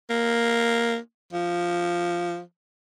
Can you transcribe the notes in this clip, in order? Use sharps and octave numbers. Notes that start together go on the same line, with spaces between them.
A#3
F3